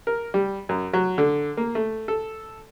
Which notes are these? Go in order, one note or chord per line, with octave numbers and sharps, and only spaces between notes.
A#4
G3
F#2
F#3
D3
A#3
A3
A4